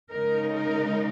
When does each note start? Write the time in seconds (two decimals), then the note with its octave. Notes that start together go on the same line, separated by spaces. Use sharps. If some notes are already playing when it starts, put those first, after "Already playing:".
0.11 C#3 G#3 D#4 A#4
0.54 A#4